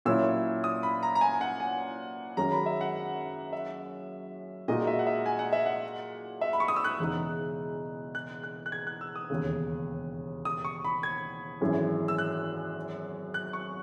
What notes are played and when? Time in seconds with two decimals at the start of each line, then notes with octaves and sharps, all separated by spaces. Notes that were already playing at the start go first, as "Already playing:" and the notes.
0.05 A#2 F#3 C#4 E4 E6
0.64 D#6
0.83 B5
1.03 A#5
1.15 A#5
1.21 G#5
1.41 F#5
1.60 G#5
2.37 F#2 D#3 G#3 C#4 F#4 A#5
2.52 B5
2.66 E5
2.81 F#5
3.53 E5
4.68 A#2 G#3 D#4 F#4 D#5
4.87 E5
4.99 F#5
5.07 E5
5.26 G#5
5.39 F#5
5.53 E5
5.66 F#5
6.41 E5
6.53 B5
6.60 C#6
6.68 D#6
6.76 E6
6.84 F#6
6.99 E1 E2 C#3 G#3 D#4
8.15 F#6
8.43 F#6
8.66 F#6
8.72 G#6
8.87 F#6
9.01 E6
9.16 D#6
9.30 E1 D#2 C#3
10.45 D#6
10.65 C#6
10.85 B5
11.03 G#6
11.61 G#1 F#2 E3 G#3
12.08 E6
12.18 F#6
13.34 F#6
13.53 C#6